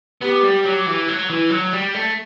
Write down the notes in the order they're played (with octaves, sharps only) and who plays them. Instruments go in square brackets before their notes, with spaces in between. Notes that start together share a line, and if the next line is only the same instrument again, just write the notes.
[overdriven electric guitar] B3 [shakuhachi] G4
[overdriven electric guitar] G3
F#3
E3
F#3
E3
F#3
G3
A3